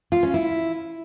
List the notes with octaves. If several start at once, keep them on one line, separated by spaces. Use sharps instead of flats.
F4
C#4
E4